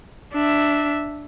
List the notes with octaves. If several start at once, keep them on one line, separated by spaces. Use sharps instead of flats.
D4 E5